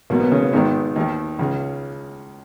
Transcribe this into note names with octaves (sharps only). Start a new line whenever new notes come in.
B1 B2 A#3
B3
C#3 C#4
B3
G#1 G#2 D#3 B3
D#2 D#3
C#2 C#3